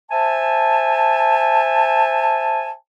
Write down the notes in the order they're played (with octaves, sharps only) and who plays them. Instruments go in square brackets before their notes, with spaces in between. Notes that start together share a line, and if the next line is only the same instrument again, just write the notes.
[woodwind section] C5 E5 G#5 A5